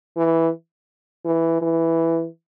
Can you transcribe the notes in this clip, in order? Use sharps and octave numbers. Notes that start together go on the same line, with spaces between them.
E3
E3
E3